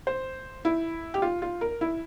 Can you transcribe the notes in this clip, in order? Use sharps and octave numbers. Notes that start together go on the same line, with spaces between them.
C5
E4
G4
F4
F4
A#4
E4